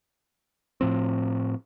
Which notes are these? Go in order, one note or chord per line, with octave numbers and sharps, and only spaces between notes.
A2 F3 C4